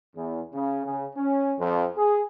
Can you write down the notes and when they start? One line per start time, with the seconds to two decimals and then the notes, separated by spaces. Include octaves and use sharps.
0.15 E2
0.53 C#3
0.85 C#3
1.16 C#4
1.58 F2
1.97 G#4